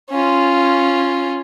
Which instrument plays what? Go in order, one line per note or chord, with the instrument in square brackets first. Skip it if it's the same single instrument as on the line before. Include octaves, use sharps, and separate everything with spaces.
[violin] C#4 F4